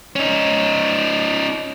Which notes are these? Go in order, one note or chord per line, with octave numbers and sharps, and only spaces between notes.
C#4 D#4